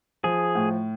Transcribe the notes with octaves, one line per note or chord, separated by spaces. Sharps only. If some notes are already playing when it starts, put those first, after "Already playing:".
F3 G#4
A2